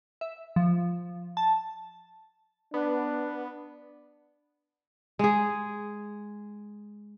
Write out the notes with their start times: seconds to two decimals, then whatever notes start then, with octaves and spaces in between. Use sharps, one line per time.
0.21 E5
0.56 F3
1.37 A5
2.74 B3 D4
5.19 G#3 G#4